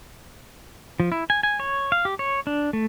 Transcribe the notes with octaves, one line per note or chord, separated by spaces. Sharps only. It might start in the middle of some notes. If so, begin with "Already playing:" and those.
F3
E4
G#5
G#5
C#5
F5
G4
C#5
D4
A3